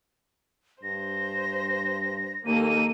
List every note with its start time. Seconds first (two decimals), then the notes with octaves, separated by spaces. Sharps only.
0.83 G2 C5 A#6
2.46 D#2 A#3 D#4 A4 D#7